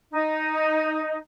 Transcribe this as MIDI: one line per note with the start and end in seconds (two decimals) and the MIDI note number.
0.12 1.16 63